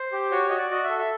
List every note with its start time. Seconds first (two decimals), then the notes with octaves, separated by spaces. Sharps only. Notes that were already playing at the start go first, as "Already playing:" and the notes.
Already playing: C5
0.12 G4
0.31 F#4 C#5
0.49 F#4 D#5
0.58 D5
0.71 F#4 D#5
0.84 E5
0.90 A4
0.99 E5